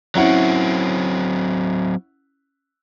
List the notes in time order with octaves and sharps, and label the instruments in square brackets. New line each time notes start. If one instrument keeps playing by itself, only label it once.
[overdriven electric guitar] F#3 C4 [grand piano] C#4 E4 F#5